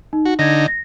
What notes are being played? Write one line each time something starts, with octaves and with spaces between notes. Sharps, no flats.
D#4
F#4
D3 D#4 G#6 A#6
A#6